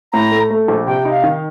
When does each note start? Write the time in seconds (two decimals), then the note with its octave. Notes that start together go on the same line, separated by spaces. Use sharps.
0.13 A2 A#5
0.32 A3
0.50 A3
0.68 A#1
0.87 C3 G5
1.05 D#4
1.11 F5
1.23 D#3